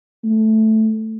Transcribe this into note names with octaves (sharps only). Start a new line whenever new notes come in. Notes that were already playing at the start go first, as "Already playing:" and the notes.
A3